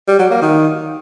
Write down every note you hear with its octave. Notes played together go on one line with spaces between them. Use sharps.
G3
F#3
A#3
D#3